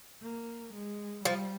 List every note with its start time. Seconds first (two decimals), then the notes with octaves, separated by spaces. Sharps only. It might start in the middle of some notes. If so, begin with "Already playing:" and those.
0.22 A#3
0.74 G#3
1.25 F3 G3